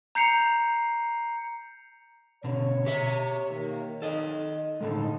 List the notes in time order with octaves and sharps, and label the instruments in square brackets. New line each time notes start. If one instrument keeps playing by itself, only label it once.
[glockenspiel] A#5 G6 C7 C#7 F7
[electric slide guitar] B2 D3 [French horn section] C#5
[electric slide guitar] G4 E5
[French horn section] D#3 A#3
[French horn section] D#3 [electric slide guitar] A4 D#5
[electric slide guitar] A2 D3 G#3 [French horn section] D#4 A4